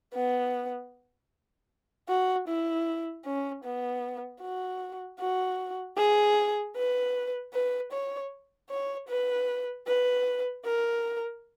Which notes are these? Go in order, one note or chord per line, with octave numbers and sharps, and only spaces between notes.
B3
F#4
E4
C#4
B3
F#4
F#4
G#4
B4
B4
C#5
C#5
B4
B4
A#4